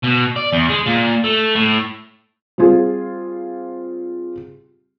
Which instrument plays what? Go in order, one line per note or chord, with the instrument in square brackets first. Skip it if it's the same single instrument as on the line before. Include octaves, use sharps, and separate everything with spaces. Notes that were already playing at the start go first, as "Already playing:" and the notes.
[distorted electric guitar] B2
D5
E2
G#3
A#2
A3
A2
[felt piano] G3 C4 F4 G#4